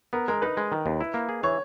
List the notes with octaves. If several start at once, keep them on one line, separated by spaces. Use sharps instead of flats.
B3 A#4
G#3 A#4
D#4 B4
G#3
D#3
D#2
E4
A#3
G#4
E3 C#5